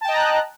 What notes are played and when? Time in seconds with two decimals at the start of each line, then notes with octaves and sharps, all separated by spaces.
0.01 A5
0.05 G5
0.08 D#5
0.12 A#5
0.16 F#6